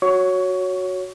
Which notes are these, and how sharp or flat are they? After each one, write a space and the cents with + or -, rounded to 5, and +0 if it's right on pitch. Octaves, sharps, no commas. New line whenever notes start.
F#4 +0 C#5 +0 C#6 +25